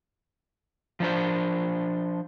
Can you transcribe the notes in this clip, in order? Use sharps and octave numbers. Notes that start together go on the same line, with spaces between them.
F3 D4 C5